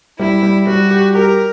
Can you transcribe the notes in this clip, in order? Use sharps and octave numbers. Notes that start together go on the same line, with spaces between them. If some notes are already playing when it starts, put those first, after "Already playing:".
G3 E4
G3
G3 F#4
G4
G4 A#4